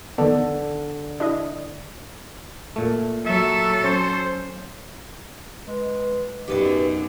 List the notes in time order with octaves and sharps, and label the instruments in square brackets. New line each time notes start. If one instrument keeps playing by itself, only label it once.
[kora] D3 [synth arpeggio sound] D#3 B3
[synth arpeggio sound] D4 E4 D#5
[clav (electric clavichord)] A#2 A3
[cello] F#3 A4 [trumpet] E5
[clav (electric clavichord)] C#4 [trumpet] C5
[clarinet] G#3 [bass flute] B4
[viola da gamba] F#2 B2 [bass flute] D#4 [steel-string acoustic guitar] G4 B4 D5 [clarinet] D6